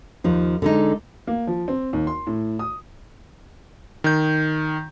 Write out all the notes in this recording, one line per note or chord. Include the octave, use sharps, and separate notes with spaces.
D#2 F3 D#4
D3 G#3 D#4
A#3
F3
C4
D#2
C6
A2
D#6
D#3 G6